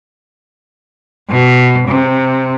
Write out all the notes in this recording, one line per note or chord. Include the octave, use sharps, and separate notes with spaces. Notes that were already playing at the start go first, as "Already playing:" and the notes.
B2
C3